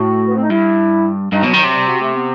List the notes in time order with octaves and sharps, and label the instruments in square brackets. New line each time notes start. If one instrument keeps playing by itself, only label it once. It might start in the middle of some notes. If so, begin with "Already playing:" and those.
Already playing: [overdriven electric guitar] A2 [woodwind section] F#4
[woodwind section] B3
C4
D#4
[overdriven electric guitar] G2 [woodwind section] E4
[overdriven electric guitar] G2 [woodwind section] D#4
[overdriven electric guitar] B2 [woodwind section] F#3
[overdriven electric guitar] D#3
[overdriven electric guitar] C3 [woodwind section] F#3
[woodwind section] G3
F#4
A3
B3